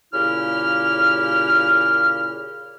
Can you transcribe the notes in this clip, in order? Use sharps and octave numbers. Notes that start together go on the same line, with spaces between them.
A#2 C#3 E4 G4 F6